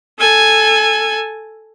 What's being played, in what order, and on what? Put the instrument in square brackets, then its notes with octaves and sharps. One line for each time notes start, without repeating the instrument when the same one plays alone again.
[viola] A4 G#5